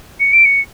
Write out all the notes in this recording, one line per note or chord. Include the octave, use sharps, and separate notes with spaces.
C#7
D7
C#7